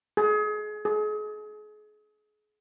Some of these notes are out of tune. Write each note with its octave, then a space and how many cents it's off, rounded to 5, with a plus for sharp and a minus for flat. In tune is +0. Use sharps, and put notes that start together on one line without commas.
G#4 +30
G#4 +35